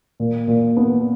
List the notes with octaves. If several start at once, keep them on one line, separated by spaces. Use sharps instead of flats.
A#2
A#2
B3